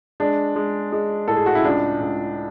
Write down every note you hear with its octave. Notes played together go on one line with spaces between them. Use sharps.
G#3 D4
G#3
G#3
A2 A4
G#4
F#4
E4
C#2 D4
C#2